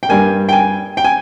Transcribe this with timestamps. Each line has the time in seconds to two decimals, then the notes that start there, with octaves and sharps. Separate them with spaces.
0.03 G5
0.09 G2 G3 A#3 G#5
0.49 G5
0.53 G#5
0.97 G5
1.04 G#5